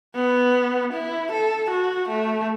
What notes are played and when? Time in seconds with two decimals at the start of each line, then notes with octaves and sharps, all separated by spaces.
0.15 B3
0.93 E4
1.32 A4
1.71 F#4
2.09 A3